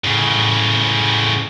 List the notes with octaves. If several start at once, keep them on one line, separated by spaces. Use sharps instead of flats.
A2 C#3